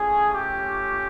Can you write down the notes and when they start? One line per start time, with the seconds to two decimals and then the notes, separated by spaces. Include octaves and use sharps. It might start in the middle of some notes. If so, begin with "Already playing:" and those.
Already playing: A3 C#4 F4 G#4
0.32 G4